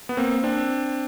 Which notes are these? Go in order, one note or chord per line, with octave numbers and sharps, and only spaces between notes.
B3
A#3 C4
C4 D4